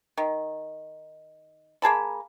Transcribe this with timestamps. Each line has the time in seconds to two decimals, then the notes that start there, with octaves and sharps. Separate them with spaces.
0.17 D#3
1.82 A#3 G#4 A5 B5